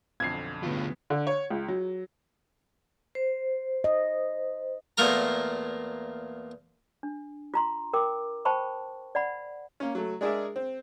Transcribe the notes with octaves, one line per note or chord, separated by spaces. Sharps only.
B1 F2 D3 G#6 C7
D2 G2 B3 F4
D3
C#5
C#2
F#3
C5
D#5
E2 A#2 A3 A#3 A#4 A#5
D4
F4 A#5 C6
A#4 G5 D6
C5 G5 A5 B5 C#6
D5 F#5 B5
A#3 C#4
F#3 A3
G#3 D4 G#4 A#4 D5 E5
C4